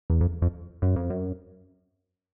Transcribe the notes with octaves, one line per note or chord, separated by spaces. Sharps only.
E2
F2
F2
F#2
F2
F#2